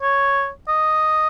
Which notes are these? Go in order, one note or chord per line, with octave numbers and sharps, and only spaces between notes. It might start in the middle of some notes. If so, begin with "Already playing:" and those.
C#5
D#5